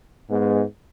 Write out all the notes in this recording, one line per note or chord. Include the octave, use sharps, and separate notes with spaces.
G#2 G#3 B3